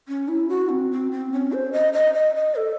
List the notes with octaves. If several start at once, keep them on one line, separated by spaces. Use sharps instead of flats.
C#4
E4
F#4
C4
C4
C4
C#4
C5
D#5
D#5
D#5
D#5
A4